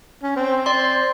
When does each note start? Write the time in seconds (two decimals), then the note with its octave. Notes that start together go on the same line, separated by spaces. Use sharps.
0.23 C#4
0.36 C4
0.66 D5 C6